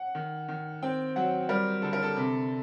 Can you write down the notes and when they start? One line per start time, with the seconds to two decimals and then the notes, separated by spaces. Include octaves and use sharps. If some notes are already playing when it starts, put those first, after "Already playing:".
Already playing: F#5
0.15 D#3
0.48 D#3
0.82 C4 G5
1.16 F#3 F#5
1.49 G3 A#4
1.82 D3 A4
1.93 A#4
2.03 A4
2.16 C3